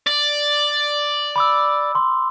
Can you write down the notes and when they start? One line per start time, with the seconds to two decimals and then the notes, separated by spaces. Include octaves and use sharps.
0.07 D5
1.36 B5 D6 E6
1.95 C6